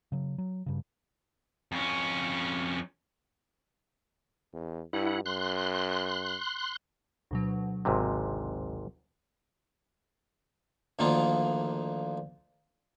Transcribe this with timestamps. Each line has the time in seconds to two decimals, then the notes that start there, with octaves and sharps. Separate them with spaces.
0.12 C#3 F#3
0.38 F#3
0.66 G2 C#3
1.72 F2 C#4
4.53 E2
4.93 G2 E4 F#5
5.26 F#2 C6 F#6
7.31 D2 B2 F#3
7.85 G#1 G#2 C3
10.99 D2 D3 D#3 F3 A#3 F4